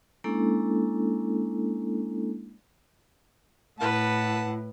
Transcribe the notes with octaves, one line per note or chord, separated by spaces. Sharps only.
G#3 A#3 C#4 D4 E4 A4
A2 E4 B4 F#5 A5